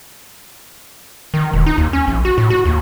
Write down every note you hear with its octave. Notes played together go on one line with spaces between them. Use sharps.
D#3
E1
D#4
D#2
C#4
A#1
F#4
A2
F#4
D#2